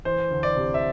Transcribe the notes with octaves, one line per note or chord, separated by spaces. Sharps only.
E3 C5
D2
D5
C3
E5